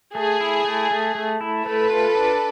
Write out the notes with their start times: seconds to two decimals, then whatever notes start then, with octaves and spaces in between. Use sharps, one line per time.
0.15 A3 G#4
0.40 E4
0.65 A3
0.91 A3
1.15 A3
1.41 E4
1.65 A3 A4 B4
1.90 F4
2.15 D4